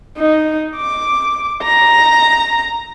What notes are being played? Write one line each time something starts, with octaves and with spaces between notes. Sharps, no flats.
D#4
D6
A#5